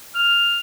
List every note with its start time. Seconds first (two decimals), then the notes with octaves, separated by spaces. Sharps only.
0.15 F6